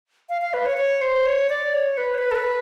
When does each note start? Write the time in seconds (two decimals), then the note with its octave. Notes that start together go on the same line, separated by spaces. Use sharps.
0.29 F5
0.41 F5
0.54 B4
0.66 C#5
0.77 C#5
1.02 C5
1.26 C#5
1.50 D5
1.74 C#5
1.97 B4
2.14 C#5
2.18 B4
2.31 A4
2.35 B4